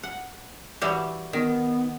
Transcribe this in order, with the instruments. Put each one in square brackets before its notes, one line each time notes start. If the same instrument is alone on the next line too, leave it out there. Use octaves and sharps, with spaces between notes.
[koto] F#5
E3 G3 F#4
[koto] D#3 [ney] B3